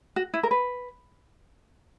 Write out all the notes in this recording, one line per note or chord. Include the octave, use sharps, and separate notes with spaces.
F#4
E4
A#4
B4